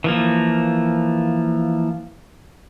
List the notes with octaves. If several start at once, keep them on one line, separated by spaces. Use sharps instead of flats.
E3 F3 A#3